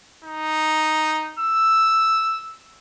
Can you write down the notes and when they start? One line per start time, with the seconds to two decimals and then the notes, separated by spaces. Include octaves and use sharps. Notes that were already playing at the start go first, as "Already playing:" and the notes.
0.24 D#4
1.39 E6